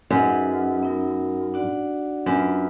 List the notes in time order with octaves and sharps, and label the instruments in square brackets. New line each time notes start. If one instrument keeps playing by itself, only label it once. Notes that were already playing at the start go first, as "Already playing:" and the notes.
[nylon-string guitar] F#2 [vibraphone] D#4 G#4 B4 D#5 F#5
[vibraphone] B3 D#4 A#4
D4 F#4 D5 F#5
[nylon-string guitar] F#2 [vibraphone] F#3 B3 D4 F4 B4